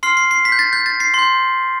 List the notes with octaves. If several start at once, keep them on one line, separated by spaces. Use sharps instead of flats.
C6 F6 C7
C7
C7
B6
G6
A6
G6
A6
C7
C6 G6